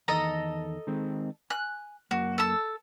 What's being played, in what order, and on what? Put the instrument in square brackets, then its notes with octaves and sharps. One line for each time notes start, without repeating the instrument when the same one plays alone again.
[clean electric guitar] E2 D#3 [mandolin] A4 D#5 A#5
[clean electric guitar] D#3 G#3 C4
[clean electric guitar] G#5 [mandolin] F#6
[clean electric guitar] F#2 A#3 [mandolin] F#4
[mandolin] A4 A5 E6